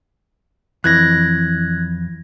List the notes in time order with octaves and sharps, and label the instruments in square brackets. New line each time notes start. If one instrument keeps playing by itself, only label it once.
[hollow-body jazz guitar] F2 E3 [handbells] F#6 G#6 A#6